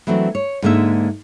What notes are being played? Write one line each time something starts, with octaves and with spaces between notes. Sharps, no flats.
E3 F#3 A3 C4 D4 F#4
C#5
G#2 D3 G#3 A#3 D4 E5